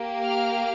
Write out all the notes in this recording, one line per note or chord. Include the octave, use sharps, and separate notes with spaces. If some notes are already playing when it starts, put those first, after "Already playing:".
Already playing: A#3 G4
F6